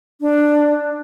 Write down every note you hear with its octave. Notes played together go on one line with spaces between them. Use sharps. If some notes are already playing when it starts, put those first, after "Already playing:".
D4